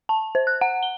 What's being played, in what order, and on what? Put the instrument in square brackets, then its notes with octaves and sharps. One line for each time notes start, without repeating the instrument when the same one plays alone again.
[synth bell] A5
C5
F#6
F#5
G7